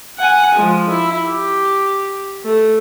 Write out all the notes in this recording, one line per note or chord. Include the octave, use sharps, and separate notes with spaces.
F#5 G#5
F3 G#3
E4
G4
A3